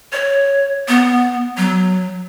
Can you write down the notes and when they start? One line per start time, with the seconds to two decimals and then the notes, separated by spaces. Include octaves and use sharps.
0.13 C#5
0.88 B3
1.57 F#3